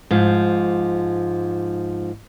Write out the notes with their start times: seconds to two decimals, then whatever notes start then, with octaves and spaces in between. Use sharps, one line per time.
0.11 G#2 F3